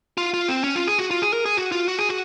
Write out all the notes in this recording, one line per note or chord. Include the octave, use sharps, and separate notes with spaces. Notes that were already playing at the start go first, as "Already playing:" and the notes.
F4
F4
C4
C#4
F4
G#4
F#4
F4
G#4
A#4
G#4
F#4
F4
F#4
G#4
F#4